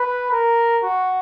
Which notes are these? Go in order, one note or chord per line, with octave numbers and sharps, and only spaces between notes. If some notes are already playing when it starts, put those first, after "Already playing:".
Already playing: B4
A#4
F#4